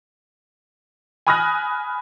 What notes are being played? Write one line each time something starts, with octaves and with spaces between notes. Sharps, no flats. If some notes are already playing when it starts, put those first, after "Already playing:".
G#5 B5 D#6 F6 F#6 A#6